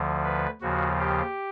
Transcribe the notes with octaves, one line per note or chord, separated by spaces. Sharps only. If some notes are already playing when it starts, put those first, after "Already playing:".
Already playing: D2 D3 F3
B4
D#2 C#3 F3 F#4
G4